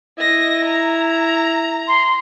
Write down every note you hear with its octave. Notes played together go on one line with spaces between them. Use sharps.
E4 D#5 A#6
A#5
C6